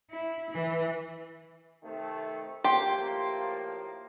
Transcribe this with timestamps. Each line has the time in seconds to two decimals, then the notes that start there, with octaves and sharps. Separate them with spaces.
0.12 E4
0.50 E3
1.83 C3 D#3 A3
2.64 A2 F3 A#3 G4 C6